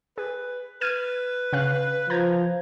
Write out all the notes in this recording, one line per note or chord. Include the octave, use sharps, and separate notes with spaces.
G#4 B4
B4 F6 G#6 D#7
C#3 F5 F#6
F3 A#5 G6 G#6